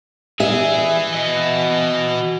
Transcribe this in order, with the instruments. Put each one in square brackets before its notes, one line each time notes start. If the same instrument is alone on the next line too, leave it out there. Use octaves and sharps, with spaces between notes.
[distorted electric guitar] E3 G#5 [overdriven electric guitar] G#4 [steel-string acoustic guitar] E5
[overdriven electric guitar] F#4 D#5